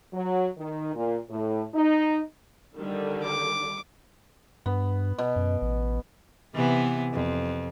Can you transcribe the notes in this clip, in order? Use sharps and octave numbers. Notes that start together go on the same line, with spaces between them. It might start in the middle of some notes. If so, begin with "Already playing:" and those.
F#3
D#3
A#2
A2
D#4
D3 D#3 G3
D6
G2 B3
B2
F#2
A1
C3 E3 B3
F2